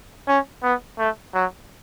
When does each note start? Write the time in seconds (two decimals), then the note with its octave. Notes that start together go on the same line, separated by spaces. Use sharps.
0.28 C#4
0.63 B3
0.99 A3
1.35 F#3